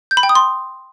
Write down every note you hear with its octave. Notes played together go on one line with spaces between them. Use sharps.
G6
B5
G5
D#6
C6